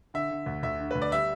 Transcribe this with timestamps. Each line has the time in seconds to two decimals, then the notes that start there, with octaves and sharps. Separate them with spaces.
0.14 D3 E5
0.31 D3
0.46 D2
0.63 D2 E5
0.80 D3
0.91 D2 B4
1.02 D5
1.12 G3 E5